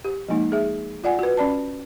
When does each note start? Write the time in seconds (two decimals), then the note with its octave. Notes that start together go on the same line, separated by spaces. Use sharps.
0.04 G4
0.29 F3 G#3 A#3 D#4
0.52 G#4 E5
1.04 F4 D5 F#5 G#5
1.19 F#4 B4
1.37 C#4 D5 A5